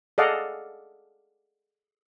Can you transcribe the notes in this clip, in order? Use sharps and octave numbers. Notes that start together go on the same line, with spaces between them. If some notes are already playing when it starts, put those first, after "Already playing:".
G#4 A4 D5 D#5 F5 F#5